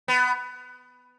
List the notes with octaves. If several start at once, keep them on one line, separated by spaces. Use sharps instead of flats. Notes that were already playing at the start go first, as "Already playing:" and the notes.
B3